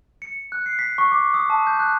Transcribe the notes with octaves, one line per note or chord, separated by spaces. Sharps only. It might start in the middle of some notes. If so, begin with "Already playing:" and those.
C#7
F#6
C7
B6
C#6
D6
D#6
A5
G6
F#6